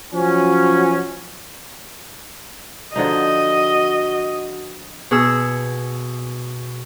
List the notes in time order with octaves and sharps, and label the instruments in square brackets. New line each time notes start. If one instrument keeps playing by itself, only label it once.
[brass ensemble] F3 F#3 C#4
[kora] D3 F3 D#4 [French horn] F#4 [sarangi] D#5
[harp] B2 G#4 E6